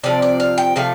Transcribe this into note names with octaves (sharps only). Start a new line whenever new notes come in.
C3 F3 C4 D5
D5
F5
G5
C3 F3 A3 F5